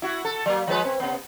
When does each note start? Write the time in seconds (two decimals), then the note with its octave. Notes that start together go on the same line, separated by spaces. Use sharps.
0.02 E4 F#4
0.25 A4
0.46 F#3 A#3
0.67 F3 G#3 B4
0.85 C4
1.00 C3 B3